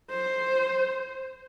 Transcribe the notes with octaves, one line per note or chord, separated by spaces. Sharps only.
C5